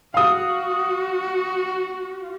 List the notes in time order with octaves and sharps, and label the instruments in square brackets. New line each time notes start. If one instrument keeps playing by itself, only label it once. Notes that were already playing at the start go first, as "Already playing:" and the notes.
[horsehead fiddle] F#4 [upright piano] F5 D#6